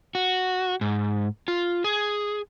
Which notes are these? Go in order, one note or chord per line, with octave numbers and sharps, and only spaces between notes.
F#4
G#2
F4
G#4